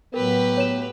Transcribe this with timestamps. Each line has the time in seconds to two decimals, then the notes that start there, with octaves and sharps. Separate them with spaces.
0.14 A2 F#3 B3 G4 A#4 B4
0.57 C#5 E7